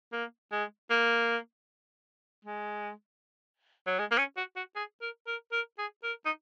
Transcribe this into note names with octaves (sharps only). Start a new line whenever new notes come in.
A#3
G#3
A#3
G#3
F#3
G#3
A#3
C#4
F#4
F#4
G#4
A#4
A#4
A#4
G#4
A#4
D#4